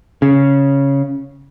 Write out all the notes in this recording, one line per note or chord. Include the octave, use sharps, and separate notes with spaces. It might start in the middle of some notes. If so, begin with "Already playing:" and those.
C#3